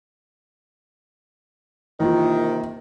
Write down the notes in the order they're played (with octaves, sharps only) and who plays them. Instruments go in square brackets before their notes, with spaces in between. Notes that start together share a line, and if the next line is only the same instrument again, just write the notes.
[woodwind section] C3 D#3 [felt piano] E3 A#3 F4